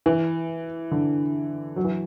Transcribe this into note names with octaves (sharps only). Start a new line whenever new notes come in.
E3
D3
F#3
E3